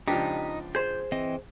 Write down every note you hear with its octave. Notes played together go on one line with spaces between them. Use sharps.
C#2 F3 D4 D#4 G4
G#4 C5 G6
E3 C4 D#5